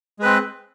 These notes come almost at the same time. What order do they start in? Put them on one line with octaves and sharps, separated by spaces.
G#3 B4 C4